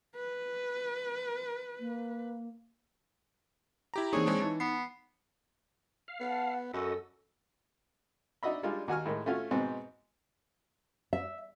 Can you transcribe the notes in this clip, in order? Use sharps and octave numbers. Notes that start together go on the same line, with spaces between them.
B4
A#3
E4 G4 A#5
E3 A#3 C4 D4 D#4 G#4 C#5
G#3 C4 D4
E3 D#4 A5
B3 C7
F5
B3 F#5 A5
F#2 F#4 A4 D#5 E6
D4 D#4 F#4 D#5 E5 B5
G3 G#3 D4 D#4 F4
D#2 F#4 G#5 F6
A2 D#3 G#3
A3 C#4 F4 F#4
G#2 B2 B3 C4
E5